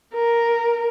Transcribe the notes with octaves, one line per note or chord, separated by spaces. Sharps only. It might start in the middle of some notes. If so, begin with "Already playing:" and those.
A#4